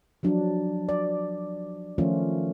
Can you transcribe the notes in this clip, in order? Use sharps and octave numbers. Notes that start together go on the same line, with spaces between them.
F3 F#3 D4
D5
D#3 F3 A3 C#4 F4